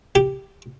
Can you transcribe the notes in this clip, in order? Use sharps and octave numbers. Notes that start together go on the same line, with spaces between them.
G4